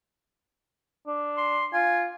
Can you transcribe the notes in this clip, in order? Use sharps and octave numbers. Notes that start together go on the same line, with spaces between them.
D4
C6
F4 G#5